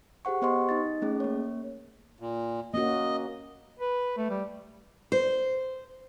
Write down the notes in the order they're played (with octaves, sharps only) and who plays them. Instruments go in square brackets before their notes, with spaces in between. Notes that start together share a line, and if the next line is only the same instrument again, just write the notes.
[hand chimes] G4 G#4 C5 F#5 C#6
B3 G4 C5 D#5 C6 C#6
D#4 D#5 A6
A3 C#4 G#4
A#3 C#5
[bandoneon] A#2
[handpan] A#3 C#4 F#4 [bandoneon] D#5
[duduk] B4
A3
G3
[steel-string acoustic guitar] C5